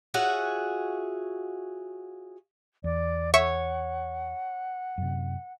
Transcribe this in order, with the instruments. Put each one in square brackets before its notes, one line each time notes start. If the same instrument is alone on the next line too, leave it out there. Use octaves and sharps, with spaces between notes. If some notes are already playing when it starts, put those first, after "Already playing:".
[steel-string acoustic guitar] F4 F#4 G#4 C#5 E5 F#5
[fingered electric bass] E2 [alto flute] D5
[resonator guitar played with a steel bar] C#5 [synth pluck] E5 C#6 [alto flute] F#5
[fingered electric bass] F#2 C3